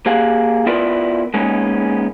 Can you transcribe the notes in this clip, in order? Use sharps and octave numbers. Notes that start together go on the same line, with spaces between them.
A#3 G4 G#4 F5 F#5
B3 E4 F4 A#4 B4 D5
G#3 A#3 B3 C#4 D#4